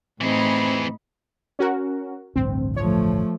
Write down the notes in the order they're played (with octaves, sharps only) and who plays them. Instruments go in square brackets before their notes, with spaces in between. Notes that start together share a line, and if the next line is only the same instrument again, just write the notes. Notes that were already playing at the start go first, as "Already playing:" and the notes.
[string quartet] A2 D#4 B5 [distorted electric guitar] E3 G#4 [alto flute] C4
[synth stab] C#4 F#4 A#4
[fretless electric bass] A1 D2 G2 [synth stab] C4
[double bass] F3 A3 [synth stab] C#5